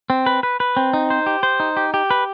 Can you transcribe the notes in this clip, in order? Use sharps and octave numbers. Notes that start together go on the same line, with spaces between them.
C4
B4
B4
B4
C4
D#4
C5
G4
C5
D#4
G4
G4
B4